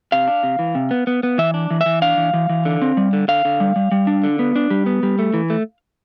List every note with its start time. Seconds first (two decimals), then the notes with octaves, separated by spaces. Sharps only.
0.12 C3 F5
0.27 D4
0.43 C3
0.59 E3
0.75 C3
0.91 B3
1.07 B3
1.23 B3
1.38 E3 E5
1.54 D4
1.71 E3
1.81 E5
1.86 E3
2.02 D4 F5
2.17 E3
2.33 E3
2.49 E3
2.65 D3
2.82 C4
2.97 G3
3.13 D3
3.28 D3 F5
3.45 D3
3.60 G3
3.76 G3
3.92 G3
4.07 D4
4.24 D3
4.39 B3
4.56 D4
4.70 G3
4.86 B3
5.03 G3
5.19 A3
5.34 E3
5.50 A3